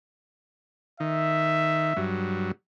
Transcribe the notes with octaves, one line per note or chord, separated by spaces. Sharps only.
D#3 E5
G2 F#3